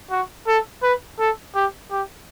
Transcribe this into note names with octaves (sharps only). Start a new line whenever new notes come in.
F#4
A4
B4
A4
G4
G4